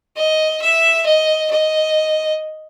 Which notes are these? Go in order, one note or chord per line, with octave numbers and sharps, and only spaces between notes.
D#5
E5
D#5
D#5